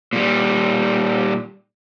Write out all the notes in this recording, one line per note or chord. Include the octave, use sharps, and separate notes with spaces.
A#2 G3